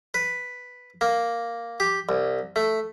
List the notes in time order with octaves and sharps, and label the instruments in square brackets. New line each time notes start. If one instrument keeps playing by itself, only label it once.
[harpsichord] B4
A#3
G4
C2
A3